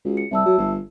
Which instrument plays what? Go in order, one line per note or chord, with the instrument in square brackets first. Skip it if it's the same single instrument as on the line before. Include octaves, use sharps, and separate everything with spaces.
[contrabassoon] C#2 [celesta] F#4
[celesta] C#7
[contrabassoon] C2 [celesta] E5 A5 E6
[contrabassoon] F#3
G1